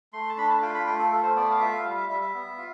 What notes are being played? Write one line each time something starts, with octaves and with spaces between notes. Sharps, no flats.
A3 C6
A5
D4 B5
A5
F4 G5
B5
A3 G5
A4
A3 A4
C5
B3 D5
F5
F4 E5
G3 F5
E5
G3 E5
E5
B3
F4